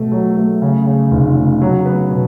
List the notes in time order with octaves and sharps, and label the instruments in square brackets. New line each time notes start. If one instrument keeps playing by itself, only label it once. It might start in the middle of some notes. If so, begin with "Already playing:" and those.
Already playing: [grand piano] B2 A3
F#3
A3
C#3
C#3
F1
C#3
F#3
B3
B2